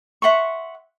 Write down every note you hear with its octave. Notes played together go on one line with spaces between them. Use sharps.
E5 F#5 C6 C#6